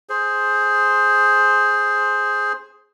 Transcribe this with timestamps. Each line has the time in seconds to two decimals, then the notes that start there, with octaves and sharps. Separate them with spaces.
0.09 G#4 C5